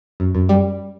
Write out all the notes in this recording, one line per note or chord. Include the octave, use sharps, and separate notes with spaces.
F#2
F#2
G3